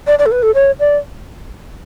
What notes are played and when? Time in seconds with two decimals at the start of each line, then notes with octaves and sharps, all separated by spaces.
0.07 D5
0.19 D5
0.26 A4
0.32 B4
0.43 A4
0.55 C#5
0.80 D5